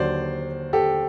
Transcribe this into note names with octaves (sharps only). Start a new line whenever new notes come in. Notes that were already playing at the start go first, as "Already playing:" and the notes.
Already playing: D#2 D3 F#3 C5 D5
G4 A4